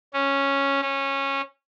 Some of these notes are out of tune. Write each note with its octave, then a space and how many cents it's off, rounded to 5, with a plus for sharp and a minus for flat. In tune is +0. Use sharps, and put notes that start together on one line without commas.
C#4 -5
C#4 -15